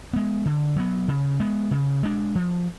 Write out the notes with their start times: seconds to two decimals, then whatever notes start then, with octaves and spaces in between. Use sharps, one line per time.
0.13 G#3 B3
0.45 D3
0.76 F#3 B3
1.08 C#3
1.40 G#3 B3
1.71 C#3
2.03 G#3 D4
2.35 F3